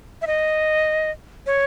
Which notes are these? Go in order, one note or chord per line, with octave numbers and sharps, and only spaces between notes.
E5
D#5
C#5